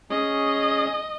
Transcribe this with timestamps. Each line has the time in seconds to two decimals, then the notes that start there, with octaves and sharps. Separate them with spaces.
0.11 C#4 G#4 C#5 D#5